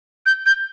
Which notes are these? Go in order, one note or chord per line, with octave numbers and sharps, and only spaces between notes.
G6
G6